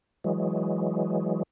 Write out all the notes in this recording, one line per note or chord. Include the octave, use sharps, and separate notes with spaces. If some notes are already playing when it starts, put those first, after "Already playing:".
E3 F#3 G#3